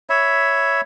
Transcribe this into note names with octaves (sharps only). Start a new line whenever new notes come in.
C#5 E5 B5